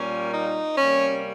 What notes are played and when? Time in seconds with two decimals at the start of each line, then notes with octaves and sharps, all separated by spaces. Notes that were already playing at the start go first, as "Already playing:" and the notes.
Already playing: A#2 G3 A#3 C#4
0.33 D#4
0.77 C3 G3 A#3 C#4